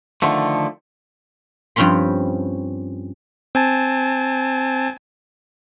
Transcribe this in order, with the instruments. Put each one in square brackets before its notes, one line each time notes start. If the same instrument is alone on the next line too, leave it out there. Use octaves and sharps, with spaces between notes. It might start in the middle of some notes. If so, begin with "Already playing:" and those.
[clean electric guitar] D3 D#3 F3 A3
[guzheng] G2 F3 C4 C#4 B5 C6
[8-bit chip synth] C4 G#5 A5